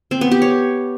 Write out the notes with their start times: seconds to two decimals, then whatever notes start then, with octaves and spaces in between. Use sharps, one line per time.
0.11 C4
0.21 B3
0.31 G4
0.42 C#5